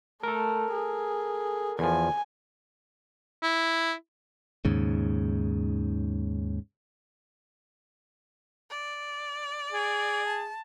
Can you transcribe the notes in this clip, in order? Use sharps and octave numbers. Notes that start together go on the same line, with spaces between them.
A3 A4 A#4
G#4
E2 F3 G#5
E4
D#2 G#2 C#3
D5
G#4
A5